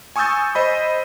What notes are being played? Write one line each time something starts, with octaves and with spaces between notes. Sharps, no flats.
G#5 C#6 D#6 E6 G6 A6
C5 D#5 B5